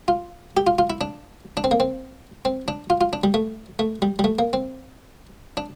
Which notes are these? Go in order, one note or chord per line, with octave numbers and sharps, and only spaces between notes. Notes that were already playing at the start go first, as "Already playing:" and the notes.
F4
G4
F4
F4
E4
D4
D4
C4
A#3
C4
C4
D4
F4
F4
D4
G3
A3
A3
G3
G3
A3
A#3
C4
D4